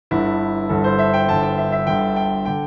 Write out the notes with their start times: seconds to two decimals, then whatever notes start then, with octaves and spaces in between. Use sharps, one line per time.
0.11 G1 G2 D3 E4
0.69 G1 G2 D3 A4
0.84 C5
0.99 E5
1.14 G5
1.28 G1 G2 D3 A5
1.43 G5
1.58 E5
1.72 E5
1.87 G1 G2 D3 G5
2.16 G5
2.45 D3 G5